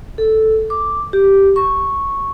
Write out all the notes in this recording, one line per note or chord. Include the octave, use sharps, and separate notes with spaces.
A4
D6
G4
C#6